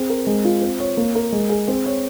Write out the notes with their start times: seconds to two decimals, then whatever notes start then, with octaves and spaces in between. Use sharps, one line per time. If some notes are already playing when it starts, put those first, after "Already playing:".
Already playing: C4 G#4
0.10 A#4
0.27 G#3
0.45 F4
0.61 C4
0.80 C#5
0.97 A#3
1.15 A#4
1.32 G#3
1.49 G#4
1.68 C4
1.86 C#5